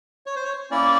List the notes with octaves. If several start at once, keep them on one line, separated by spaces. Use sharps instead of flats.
C#5
C5
C#5
A#3 C#4 E4 D5